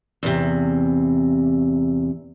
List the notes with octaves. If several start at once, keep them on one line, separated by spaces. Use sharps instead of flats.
E2 C3